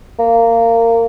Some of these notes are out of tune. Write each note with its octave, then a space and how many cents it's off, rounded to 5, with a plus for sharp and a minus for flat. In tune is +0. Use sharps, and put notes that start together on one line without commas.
A#3 -20